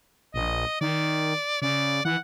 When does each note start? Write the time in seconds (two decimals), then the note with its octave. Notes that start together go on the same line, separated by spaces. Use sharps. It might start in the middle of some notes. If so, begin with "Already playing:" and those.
0.34 A#1 D#5
0.81 D#3 D5
1.62 C#3 D5
2.05 E3 F#5